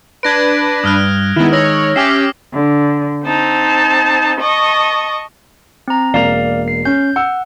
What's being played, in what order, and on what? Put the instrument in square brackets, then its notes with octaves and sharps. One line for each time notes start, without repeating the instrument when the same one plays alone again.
[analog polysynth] D4 B4 [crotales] G#6 A#6 D7
[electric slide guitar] G2 [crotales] D#6 F6 F#6
[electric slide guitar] D#3 G#3 [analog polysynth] B3 E4
[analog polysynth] C#5 [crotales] D#6 E6 A#6
[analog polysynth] C#4 G4 [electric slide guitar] E5 [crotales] D6 F6 C7
[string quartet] D3
C4 D#4 A5
D#5 A5 C#6
[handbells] C4 A#5
[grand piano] E1 A#3 F7 [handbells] D5 F5
[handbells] C7
[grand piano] C#4 [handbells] G6
[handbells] F#5 [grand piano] E6